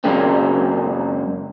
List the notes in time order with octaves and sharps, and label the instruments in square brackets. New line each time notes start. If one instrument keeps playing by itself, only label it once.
[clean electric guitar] F#2 C#3 G#3 A#3 C4